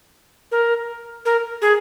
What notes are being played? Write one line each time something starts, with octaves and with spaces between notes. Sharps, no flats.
A#4
A#4
G#4